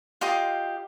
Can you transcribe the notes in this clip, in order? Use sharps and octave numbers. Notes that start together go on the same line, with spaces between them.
F4 G4 D#5 C6